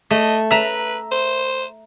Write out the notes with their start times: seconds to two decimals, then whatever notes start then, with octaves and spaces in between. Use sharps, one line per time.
0.11 A3 D#5
0.51 B4 E5 A#5
1.11 C5